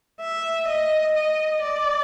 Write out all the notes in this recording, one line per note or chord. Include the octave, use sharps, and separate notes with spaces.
E5
D#5
D#5
D5